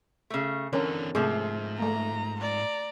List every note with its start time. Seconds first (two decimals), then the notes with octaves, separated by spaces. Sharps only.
0.30 C#3 A3
0.73 D3 E3 C4 C#4 A#4 C#5
1.15 G#2 C3 F3 A3 G#4
1.79 A3 A#3 A#5
2.41 D5 A#5